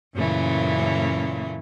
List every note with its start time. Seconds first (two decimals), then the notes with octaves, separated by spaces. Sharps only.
0.15 F#2 A#2 C#3 E3 A3 C#4